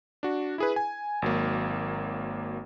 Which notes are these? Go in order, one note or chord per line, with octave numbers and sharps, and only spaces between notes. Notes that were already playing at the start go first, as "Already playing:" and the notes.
D4 F#4
E4 G#4 B4
G#5
G#1 F#3 A#3